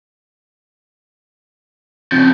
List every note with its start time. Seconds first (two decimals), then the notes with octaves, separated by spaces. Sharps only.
2.12 C#3 F3 C4